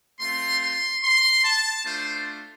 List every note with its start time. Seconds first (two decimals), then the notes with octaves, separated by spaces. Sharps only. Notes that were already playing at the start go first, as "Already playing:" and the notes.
0.20 A3 C4 F4 C6
0.62 C6
1.03 C6
1.45 A5
1.85 A3 D4 F4 C5